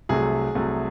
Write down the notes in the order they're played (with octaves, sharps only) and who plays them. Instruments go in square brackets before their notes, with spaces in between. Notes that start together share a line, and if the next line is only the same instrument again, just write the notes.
[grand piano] C2 C3 F#3 A3 G#4
C2 C3 F#3 A3